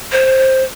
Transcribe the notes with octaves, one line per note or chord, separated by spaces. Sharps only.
C5